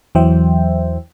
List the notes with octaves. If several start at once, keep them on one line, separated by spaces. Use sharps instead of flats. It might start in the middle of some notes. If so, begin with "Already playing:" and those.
E2 E3 F#3 C5 E5 G5